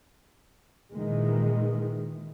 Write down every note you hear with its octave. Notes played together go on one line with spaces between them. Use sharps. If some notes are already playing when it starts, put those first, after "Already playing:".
A#2 D#3 E3 G#3